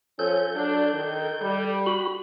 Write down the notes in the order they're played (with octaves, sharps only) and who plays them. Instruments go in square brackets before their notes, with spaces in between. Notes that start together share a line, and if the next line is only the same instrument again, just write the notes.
[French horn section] F3 C#4 [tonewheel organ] A4 G6
[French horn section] F#3 D4
D#3
G3
[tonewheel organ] F#4 B5